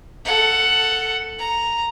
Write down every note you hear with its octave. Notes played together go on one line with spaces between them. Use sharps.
A4 F#5
A#5